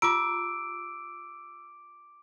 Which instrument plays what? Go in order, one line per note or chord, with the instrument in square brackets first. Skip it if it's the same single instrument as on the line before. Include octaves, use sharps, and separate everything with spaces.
[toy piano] F4 G4 A#5 [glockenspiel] D6 D7 [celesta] E6